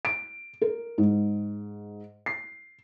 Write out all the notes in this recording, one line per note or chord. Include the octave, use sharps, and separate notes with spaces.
D7
A#4
G#2
C7